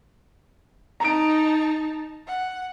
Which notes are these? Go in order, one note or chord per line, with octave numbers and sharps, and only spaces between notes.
D#4 A5 A#5 D7
F#5